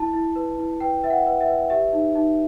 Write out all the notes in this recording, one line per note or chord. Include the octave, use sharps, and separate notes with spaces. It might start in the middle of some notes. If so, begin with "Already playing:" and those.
Already playing: E4 A5
E4
B4
E4
B4 G5
B4 E5
F#5
B4
E5
B4
G4 E5
D#4
D#4